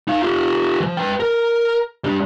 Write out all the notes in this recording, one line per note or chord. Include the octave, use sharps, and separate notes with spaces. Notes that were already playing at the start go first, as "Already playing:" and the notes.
D#4 F5
F4 G4
E3 F3
B4 G5
A#4
G3 D4